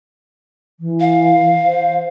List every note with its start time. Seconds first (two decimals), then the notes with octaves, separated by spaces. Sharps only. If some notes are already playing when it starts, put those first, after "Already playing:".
0.80 E3
1.00 F5
1.65 C5